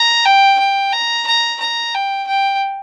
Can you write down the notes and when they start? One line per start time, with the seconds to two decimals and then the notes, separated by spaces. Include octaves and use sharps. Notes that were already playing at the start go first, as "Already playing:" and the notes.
Already playing: A#5
0.25 G5
0.59 G5
0.93 A#5
1.27 A#5
1.60 A#5
1.94 G5
2.27 G5